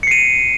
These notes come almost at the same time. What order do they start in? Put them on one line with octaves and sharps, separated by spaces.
C#7 C7 D#7